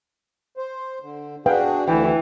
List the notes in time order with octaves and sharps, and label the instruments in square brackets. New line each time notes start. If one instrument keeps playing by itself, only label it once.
[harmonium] C5
D3
[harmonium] D4 F#4 G#4 [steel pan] B4 F5 G5
[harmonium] D2 D3 [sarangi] E3 [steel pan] G5